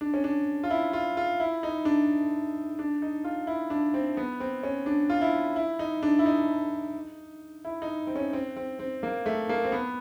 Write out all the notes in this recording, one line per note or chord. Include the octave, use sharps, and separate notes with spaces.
D4
C#4
D4
F4
E4
F4
F4
E4
D#4
D4
D4
D#4
F4
E4
D4
C4
B3
C4
C#4
D4
F4
E4
E4
D#4
D4
E4
D#4
E4
D#4
C4
C#4
C4
C4
C4
A#3
A3
A#3
C4
B3